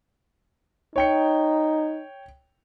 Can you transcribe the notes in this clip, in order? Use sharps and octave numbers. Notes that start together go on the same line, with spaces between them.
D#4 C#5 G5 C#7